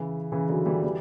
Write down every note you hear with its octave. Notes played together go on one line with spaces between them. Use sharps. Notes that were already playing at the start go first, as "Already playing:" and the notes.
Already playing: C#3 E3
C#3 E3
D3 F#3
E3 G3
E3 G3